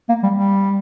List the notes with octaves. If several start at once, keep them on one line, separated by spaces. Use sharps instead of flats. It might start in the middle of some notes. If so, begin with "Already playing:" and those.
A#3
G3
G3